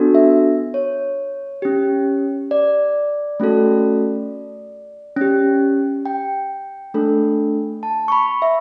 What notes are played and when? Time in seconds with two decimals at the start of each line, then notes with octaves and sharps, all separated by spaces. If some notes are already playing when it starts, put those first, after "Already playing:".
Already playing: B3 D4 F#4 A4
0.15 E5
0.74 C#5
1.62 C#4 G4
2.51 D5
3.40 A3 C#4 F#4 A4
5.17 C#4 G4
6.06 G5
6.94 A3 D4 A4
7.83 A5
8.08 C#6
8.12 B5
8.42 E5